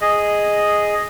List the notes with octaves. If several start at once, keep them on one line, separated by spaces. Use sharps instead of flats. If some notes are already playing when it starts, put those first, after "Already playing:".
G#4 D#5